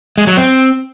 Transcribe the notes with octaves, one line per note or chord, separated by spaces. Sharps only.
G#3
F#3
C4